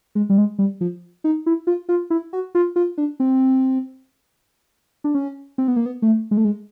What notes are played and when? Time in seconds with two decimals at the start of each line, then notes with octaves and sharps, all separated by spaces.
0.15 G#3
0.29 G3
0.38 G#3
0.59 G3
0.81 F3
1.24 D#4
1.46 E4
1.67 F4
1.89 F4
2.10 E4
2.33 F#4
2.55 F4
2.76 F4
2.98 D4
3.20 C4
5.04 D4
5.15 C#4
5.58 C4
5.68 B3
5.76 A#3
5.86 B3
6.02 A3
6.31 G#3
6.37 A3
6.45 G#3